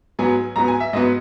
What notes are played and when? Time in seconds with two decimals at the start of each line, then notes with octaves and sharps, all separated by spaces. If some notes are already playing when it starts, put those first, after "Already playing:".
0.19 G#2 F#3 B3 G#5
0.56 G#2 F#3 B3 A#5
0.68 G#5
0.80 E5
0.93 G#2 F#3 B3 D#5